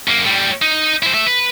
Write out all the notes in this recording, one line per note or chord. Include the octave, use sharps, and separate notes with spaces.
F#2 A#3
A2 G3
D#4
E4 C5
A4 E5
B4